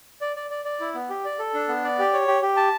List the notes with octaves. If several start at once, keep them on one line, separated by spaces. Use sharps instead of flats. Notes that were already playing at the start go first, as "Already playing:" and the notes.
D5
D5
D5
D5
E4
B3
G4
D5
A4
D4
B3
D5
G4
C#5
G4
G4
A5